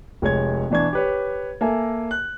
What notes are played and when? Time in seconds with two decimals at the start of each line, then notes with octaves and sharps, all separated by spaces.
0.22 F1 G#3 C#5 G#6
0.70 B2 E3 D4 C#6 G#6
0.93 G4 B4 C#5
1.61 A#3 A4 A#4 E5 G#5
2.11 F#6